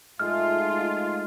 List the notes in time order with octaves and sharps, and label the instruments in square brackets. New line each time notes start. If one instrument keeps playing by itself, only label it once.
[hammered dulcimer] G#2 G#3 A3 [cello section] F4 [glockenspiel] F6